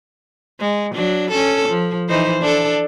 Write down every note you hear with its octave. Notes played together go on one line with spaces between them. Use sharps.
G#3
F#3 D4
C#4 A4
F3
E3 D#4 C5
D4 A4